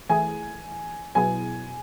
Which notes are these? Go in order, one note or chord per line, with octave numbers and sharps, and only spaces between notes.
E3 A3 E4 G#4 G#5
B2 F#3 B3 E4 G#4 G#5